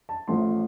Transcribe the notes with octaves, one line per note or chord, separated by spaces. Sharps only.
A5
A1 A2 F3 A3 C6